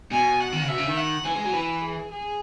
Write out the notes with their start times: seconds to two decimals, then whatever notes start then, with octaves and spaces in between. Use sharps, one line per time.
0.11 B2 G#5
0.40 F#5
0.52 D#3
0.61 C#3
0.68 B2 E5
0.78 C#3
0.88 D#3
0.97 F#5
1.25 E3 G#5
1.36 G#3
1.45 F#3
1.54 E3 B4
1.82 G#4
2.11 G#4